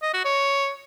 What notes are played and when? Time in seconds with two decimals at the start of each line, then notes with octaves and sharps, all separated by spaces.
0.02 D#5
0.13 F#4
0.25 C#5